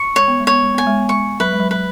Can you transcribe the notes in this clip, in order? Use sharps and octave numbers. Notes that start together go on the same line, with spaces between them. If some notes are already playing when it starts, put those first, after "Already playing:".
Already playing: C#6
G#3 C#5
B3
G#3
B3 C#5
G#3
B3 G#5
G#3
B3
G#3 C#6
F#3 B4
G#3
F#3
F#3 B4